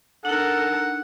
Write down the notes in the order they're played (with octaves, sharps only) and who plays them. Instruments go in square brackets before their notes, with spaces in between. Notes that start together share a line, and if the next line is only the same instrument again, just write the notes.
[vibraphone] D4 D#4 [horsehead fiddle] A4 A#4 [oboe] F#5